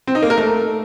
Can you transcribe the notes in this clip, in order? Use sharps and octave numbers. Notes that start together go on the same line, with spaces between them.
C4
D#4
A#3
A#4
A3